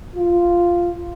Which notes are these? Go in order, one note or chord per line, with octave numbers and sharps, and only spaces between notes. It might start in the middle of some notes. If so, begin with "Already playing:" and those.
F4